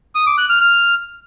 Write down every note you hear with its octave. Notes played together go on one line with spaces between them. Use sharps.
D#6
D6
F#6
F6
F6